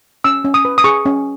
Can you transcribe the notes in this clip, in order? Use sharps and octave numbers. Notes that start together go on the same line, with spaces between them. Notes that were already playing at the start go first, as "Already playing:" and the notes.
C#4 E6
C#4
D#6
B4
D#6
G#4 C#6
C#4